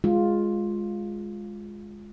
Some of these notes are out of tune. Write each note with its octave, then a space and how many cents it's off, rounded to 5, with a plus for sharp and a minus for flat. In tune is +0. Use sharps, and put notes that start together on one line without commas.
G#3 +0 F4 +5